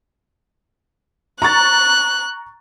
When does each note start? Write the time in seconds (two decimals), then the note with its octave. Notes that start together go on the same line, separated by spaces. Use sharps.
1.42 A#5 C#6 F#6 A6